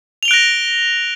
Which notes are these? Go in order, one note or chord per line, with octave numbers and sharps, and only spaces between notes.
F#6 A#6 D7 F7 G7